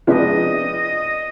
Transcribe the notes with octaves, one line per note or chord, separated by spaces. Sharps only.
C3 F3 G#3 B3 D4 D#5 E5